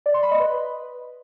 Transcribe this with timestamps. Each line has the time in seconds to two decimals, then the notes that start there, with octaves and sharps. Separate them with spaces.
0.06 D5
0.14 C6
0.23 B5
0.31 D#5
0.40 B4